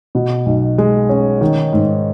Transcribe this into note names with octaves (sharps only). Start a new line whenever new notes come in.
B2
B1
G#3
C#4
D#3
G#2